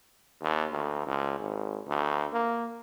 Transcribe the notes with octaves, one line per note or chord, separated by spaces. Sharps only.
D#2
D2
C#2
G#1
D2
A#3